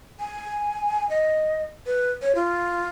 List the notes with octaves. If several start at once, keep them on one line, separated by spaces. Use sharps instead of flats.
G#5
D#5
B4
C#5
F4